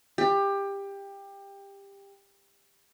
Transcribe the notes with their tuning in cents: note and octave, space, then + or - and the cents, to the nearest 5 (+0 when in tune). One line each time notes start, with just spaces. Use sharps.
G4 +20